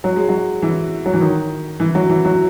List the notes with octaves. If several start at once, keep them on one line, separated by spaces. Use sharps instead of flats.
F#3
G#3
F#3
E3
F#3
E3
D#3
E3
F#3
E3
F#3